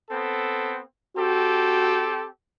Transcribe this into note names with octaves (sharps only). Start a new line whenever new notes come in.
B3 C4 A4
C4 F#4 G4 A4